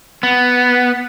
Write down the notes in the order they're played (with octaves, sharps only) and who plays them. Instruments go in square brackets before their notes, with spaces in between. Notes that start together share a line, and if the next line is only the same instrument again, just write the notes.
[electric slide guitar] B3